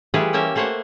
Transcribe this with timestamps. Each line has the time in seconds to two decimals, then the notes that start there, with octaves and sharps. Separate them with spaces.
0.14 E3 G3 A3 F4 G#4 B4
0.33 A#3 C#4 G4 E5 A#5
0.56 A3 A#3 C5 C#5 F#5